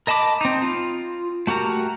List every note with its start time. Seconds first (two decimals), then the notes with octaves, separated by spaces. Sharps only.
0.07 A#4 D#5 A5 B5 D6
0.41 C4 D#4
0.62 F4
1.47 A3 F#4 G4 A#4